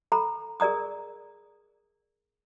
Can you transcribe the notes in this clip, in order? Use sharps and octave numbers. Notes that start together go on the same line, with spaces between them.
A4 A#5 B5
G#4 A#4 D5 A#5 D#6